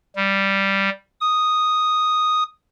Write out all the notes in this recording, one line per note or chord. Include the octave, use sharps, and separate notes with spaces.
G3
D#6